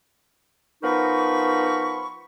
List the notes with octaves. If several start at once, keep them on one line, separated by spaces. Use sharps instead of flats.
F3 B3 D#4 A#4 B5 C#6